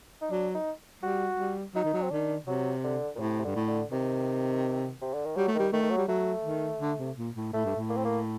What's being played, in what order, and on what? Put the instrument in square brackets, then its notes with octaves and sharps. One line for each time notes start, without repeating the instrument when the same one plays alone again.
[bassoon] D#4
[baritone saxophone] F#3 [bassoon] D4
[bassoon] D#4
[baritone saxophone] G3 [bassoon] F#4
[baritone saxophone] G3
[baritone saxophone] F#3 [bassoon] D#4
[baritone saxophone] D#3
F#3
[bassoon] C4
[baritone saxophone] D#3 [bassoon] D4
[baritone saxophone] C3 [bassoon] F#3
[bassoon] D3
A#2
[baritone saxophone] A2 [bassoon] C3
[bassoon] C3
[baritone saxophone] G2 [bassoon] D3
[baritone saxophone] A2
[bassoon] D3
[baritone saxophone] C3 [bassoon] D#3
[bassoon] C3
D3
D#3
[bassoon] F#3 [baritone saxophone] G3
[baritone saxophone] A3
[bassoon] D#3 [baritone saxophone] G3
[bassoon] D#3 [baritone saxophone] A3
[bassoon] D#3
F#3
[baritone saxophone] G3
[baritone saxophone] F#3 [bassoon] A3
[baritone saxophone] D#3
D3
C3
A#2
A2
[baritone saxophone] A2 [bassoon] A3
[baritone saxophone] G2
A2
[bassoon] A#3
C4
A#3